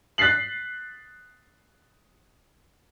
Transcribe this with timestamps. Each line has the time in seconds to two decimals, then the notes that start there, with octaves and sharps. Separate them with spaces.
0.18 F#6 A6 B6 C7 F#7